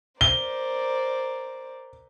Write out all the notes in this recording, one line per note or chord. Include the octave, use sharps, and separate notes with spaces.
A#4 C5 D5 G7